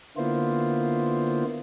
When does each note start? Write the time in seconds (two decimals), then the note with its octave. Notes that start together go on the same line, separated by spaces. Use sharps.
0.17 D3 A#3 B3 E4 F4 C5